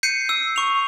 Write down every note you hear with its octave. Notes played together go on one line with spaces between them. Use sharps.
G6 C7 C#7 D#7
E6
C#6 F7